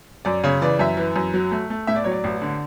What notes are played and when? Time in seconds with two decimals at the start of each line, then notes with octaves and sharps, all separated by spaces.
0.25 F#2 D5
0.44 C#3 C#5
0.62 E3 D5
0.79 F#2 E5
0.97 E3
1.16 F#2
1.34 F#3
1.51 A3
1.70 A3
1.87 A2 E5
1.96 D5
2.04 F#3 C#5
2.12 D5
2.24 A1
2.42 D3